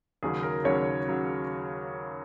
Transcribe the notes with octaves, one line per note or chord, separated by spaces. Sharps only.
D#2 C#3 F#3 C#4 G#4
A#4
D#2 C#3 F#3 C#4 C#5
C#3 F#3